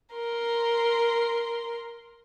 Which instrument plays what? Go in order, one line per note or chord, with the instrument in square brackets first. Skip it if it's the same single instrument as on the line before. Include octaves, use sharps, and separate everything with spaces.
[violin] A#4 C6